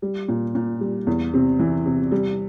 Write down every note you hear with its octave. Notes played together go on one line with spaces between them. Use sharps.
G3
A#2
A#2
G3
E2
C3
E3
C3
G3